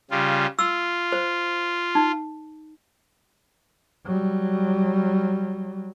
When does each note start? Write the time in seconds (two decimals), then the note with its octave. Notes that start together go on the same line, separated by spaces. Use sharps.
0.11 C#3 G3 F4
0.59 F4 E6
1.12 C5
1.95 D#4
4.06 F#3 G3